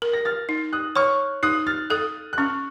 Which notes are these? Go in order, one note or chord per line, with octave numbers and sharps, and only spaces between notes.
A#4
A#6
F6 A6
D#4
D#6 F#6
C#5 C#6 F6
D#4 D#6 F#6
F6 A6
A4 D#6 F#6
F#6
C#4 C#6 F6